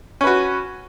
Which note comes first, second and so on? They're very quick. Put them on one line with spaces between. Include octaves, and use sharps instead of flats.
C#4 B4 F#4